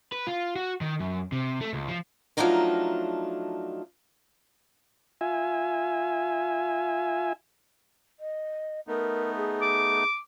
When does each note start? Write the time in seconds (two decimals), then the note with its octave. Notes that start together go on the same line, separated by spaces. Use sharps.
0.12 B4
0.27 F4
0.56 F#4
0.81 D#3
1.00 F#2
1.32 C3
1.61 A3
1.73 C#2
1.89 F3
2.37 F3 F#3 A3 D4 D#4 A#4
5.21 F4 E5 G#5
8.20 D#5
8.88 A3 B3 D#4 A#4
9.36 G#4
9.62 D6